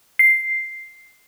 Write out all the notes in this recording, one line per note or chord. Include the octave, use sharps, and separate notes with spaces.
C7